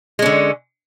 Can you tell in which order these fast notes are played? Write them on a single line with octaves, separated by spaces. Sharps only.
G#3 C#4 D3